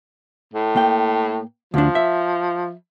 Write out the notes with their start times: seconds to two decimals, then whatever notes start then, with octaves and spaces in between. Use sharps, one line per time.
0.54 A2
0.76 A#3 G5
1.74 D2 F3 D4
1.95 E5